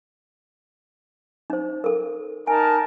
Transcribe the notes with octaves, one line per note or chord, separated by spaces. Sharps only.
D#4 C5
A4 A#4
D#4 A#4 G#5 A5